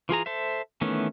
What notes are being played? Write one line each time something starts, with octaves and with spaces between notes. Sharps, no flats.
E3 F4 G#4 A#5
A4 C5 E5
D#3 E3 A3 B3 C#4